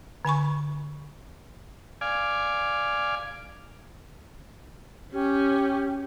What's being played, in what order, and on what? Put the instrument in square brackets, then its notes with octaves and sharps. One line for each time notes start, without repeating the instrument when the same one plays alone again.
[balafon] D3 G#5 B5 C#6
[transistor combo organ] D5 F5 G#5
[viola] C#4 [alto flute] G4